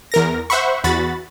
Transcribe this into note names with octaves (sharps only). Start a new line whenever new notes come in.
E2 A#4 A#6
C5 E5 F#5 B5 C#6
E2 F#4 B5 A6